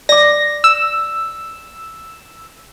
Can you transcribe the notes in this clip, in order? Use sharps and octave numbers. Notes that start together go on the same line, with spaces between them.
D5 D6 A#6
E6